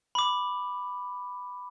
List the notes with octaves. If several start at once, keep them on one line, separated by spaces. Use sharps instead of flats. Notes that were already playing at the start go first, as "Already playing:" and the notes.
B5 D6